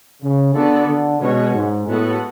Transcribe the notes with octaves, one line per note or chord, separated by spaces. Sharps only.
C#3
D3 B3 F#4 A4 D5
D3
B2 G#3 C#4 F#4 C#5
G#2
A2 G#3 B3 F#4 A4